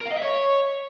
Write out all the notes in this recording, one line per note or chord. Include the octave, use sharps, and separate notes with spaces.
A#4
F5
D#5
E5
C#5